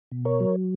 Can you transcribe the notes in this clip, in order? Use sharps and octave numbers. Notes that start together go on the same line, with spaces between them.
B2
A#4 C#5
F#3